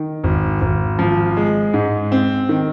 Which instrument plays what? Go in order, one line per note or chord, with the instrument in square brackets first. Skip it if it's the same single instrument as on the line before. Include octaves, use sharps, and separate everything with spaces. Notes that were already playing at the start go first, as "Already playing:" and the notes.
Already playing: [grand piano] D#3
G#1
G#1
F3
G#3
G#2
C4
D#3